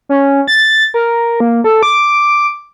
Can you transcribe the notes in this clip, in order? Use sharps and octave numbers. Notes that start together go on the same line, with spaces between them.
C#4
A6
A#4
A#3
A4
D6